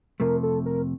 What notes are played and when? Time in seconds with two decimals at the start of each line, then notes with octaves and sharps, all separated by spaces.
0.20 F2 C3 F3 A3 A#4
0.43 A4
0.66 A#4